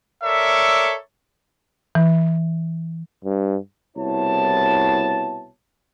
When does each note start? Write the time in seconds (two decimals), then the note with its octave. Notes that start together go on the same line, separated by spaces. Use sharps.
0.24 A4 A#4 C#5 D5 E5
1.95 E3
3.25 G2
3.97 C2 B2 E4 C#5 A5